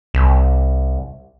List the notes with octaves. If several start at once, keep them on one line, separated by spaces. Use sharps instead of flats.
C2